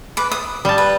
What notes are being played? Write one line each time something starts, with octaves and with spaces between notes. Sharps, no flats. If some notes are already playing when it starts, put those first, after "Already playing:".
B4 D6
D#6
G3 A5
B4